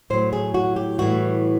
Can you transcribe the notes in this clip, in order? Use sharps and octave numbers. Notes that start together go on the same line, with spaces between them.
A2 F#3 C5
G#4
F#4
G4
A2 E3 G3 F#4